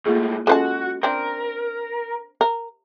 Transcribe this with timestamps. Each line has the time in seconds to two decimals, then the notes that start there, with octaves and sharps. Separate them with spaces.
0.06 G#2 A3 A#3 F4 G#4
0.47 G#3 C#4 F4 F#4 A4 B4 A5
1.03 C4 D4 A#4
2.41 A#4